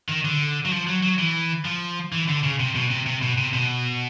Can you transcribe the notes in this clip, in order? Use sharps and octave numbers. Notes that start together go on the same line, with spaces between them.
D#3
D3
F#3
F3
F#3
F#3
E3
F3
E3
D3
C#3
C3
B2
C3
C3
B2
C3
B2